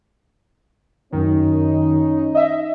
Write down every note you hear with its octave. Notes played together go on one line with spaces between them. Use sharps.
F#2 D#3 C#4 D#4
D#5 E5